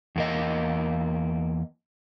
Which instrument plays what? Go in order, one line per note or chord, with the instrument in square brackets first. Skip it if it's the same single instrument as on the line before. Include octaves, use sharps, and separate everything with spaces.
[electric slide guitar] E2 A#3 D#5